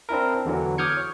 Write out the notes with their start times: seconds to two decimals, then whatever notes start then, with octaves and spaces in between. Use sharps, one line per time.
0.09 C4 D4 E4 A#4
0.45 E2 D3 E3 F#3
0.78 D6 D#6 F6 G6 G#6 C#7
0.97 C#5